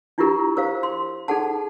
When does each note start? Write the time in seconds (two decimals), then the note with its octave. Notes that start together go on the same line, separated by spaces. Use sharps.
0.18 D4 E4 F4 G4 A#4 A#5
0.57 A#4 C5 F5
0.83 C6
1.28 D#4 G#4 A4 F#5 A5